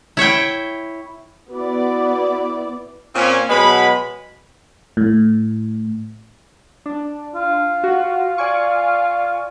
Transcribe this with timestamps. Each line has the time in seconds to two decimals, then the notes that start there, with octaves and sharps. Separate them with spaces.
0.17 E4 C#5 E5 G5
1.51 B3 E4 F#4 D5
3.15 A#2 C4 C#4
3.50 B2 F#3 G#3 B4 B5
4.97 A2
6.86 D4
7.35 F4
7.84 F#4
8.38 D5 G#5 C#6